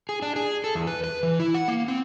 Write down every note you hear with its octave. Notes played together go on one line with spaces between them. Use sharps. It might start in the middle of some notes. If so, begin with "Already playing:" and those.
G#4
D4
G#4
A4
E2
B4
B4
E3
E4
F#5
A#3
C4